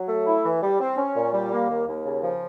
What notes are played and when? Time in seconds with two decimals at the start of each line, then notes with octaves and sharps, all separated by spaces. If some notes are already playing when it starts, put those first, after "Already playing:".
Already playing: F#3
0.09 A3
0.27 E4
0.44 E3
0.62 G3
0.80 C4
0.97 C#4
1.15 A#2
1.33 G3
1.52 A#3
1.69 D#2
1.88 D#2
2.05 C#3
2.23 F3